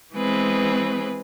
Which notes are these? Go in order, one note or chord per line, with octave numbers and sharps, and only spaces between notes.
E3 G#3 B3 C4 G#4 B4